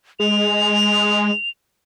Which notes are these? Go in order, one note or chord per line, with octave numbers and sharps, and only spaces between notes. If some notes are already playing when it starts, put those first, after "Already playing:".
G#3 F7